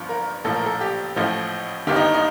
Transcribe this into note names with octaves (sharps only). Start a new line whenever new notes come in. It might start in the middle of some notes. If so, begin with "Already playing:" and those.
Already playing: G1 G2 F3
A#4
A#1 A2 F3 A4
A#4
A4
G4
A1 A2 F3
G1 G2 D#3 G4
D#4
D#4